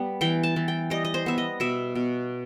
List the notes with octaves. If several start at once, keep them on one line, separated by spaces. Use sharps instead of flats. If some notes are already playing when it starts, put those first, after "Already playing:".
Already playing: G3 B3
E3 G5
A5
E3
G5
G3 D#5
D#5
C5
B3 E5
D#5
B2 E5
B2